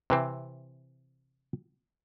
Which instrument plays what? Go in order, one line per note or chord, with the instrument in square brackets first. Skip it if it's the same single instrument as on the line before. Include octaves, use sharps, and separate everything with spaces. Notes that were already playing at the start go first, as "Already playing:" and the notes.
[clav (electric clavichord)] C3 E3 C4